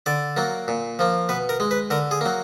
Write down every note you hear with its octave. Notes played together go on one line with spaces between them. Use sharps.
D3 D5
F#3 A#3
A#2
F3 A#3
B2 B4
A#4
G#3
B4
D3 A#4
G#4
F#3 A#3